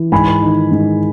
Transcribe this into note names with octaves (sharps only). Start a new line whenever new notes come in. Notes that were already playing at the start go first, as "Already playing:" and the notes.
Already playing: E3
G#2 G#5 B5
D#3
G#2